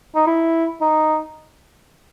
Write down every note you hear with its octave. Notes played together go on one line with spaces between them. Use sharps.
D#4
E4
D#4